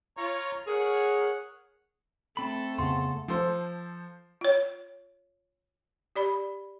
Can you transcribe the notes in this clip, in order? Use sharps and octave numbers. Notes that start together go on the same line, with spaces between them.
F4 C#5 A#5 C#6
G#4 A#4 C#5 F#5
A3 C4 A4 B5
F2 C#3 B3 C6
F3 A4 C5
F4 C#5
G4 D5 B5